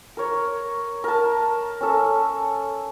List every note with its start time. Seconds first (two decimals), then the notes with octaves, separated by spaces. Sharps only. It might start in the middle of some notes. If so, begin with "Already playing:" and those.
0.17 A#4 C#5
1.04 A#4 A5
1.81 C#4 A4